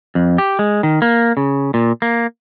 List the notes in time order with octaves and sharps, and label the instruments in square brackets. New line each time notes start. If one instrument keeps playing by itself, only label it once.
[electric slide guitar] F2
G4
G#3
D#3
A#3
C#3
A#2
A#3